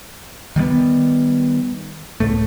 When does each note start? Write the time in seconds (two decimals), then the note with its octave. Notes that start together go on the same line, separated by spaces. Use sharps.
0.56 D#3 G3 G#3 B3
2.20 C#2 A2 A3